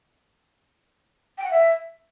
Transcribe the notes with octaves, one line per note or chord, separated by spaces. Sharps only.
G5
F#5
E5